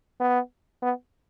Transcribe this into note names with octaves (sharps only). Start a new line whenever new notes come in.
B3
B3